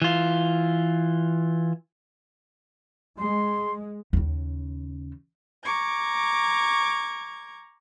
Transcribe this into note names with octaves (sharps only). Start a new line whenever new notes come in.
E3 F4
G#3 C6
D#2 C#3
A#5 C#6 D6 G#6